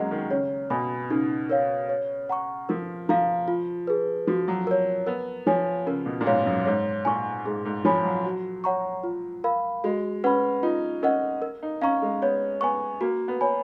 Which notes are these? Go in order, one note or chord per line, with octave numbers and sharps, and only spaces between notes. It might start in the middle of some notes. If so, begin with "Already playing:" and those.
Already playing: F#3 G#3 A#3 C#4 D#5 F#5 A#5
D#3
C#3 C#5
B2 G#5 B5
C#3 D#4
A#4 C#5 F5
C#5
F#5 A#5 C#6
F3 A#4
F3 F5 A#5
F4
G#4 B4
F3 F#4
F#3
A#4 C#5
B3 A#4
F3 C#5 G#5
C#3 A#4
B2
A#2
G#2 C#5 F5
F#2
G#2 C#5
A#2 G#5 C#6
G#2 G#4
G#2
F3 C#5 G#5 B5
F#3
F#4
C#5 F#5 A#5 C#6
F4
A#4 F5 B5
G#3 F#4
C#4 B4 F#5 B5
D#4 F4
C#4 A#4 D#5 F#5
A#4
D#4
C#4 F5 A#5 C#6
G#3
B3 C#5
B3 G#5 C#6
A#3 F#4
B3
C#5 G#5 B5